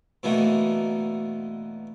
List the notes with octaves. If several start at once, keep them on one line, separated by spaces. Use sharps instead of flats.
B2 D3 E3 A3 A#3 D#4